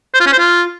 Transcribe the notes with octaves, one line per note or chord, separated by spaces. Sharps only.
C5
F4
C#4
C5
F4